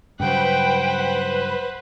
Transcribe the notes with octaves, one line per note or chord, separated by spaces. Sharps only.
G2 C#3 F#3 B4 C5 F#5 G5